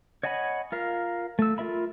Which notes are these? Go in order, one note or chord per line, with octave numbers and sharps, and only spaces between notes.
C#5 D#5 F#5 G#5 B5
F4 A#4 F5
A3 E6
F4 A#4 E5 B5